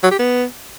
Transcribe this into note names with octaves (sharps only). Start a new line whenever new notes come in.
F#3
G4
B3